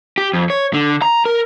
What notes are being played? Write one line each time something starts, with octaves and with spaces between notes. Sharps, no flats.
G4
F2
C#5
D3
A#5
A#4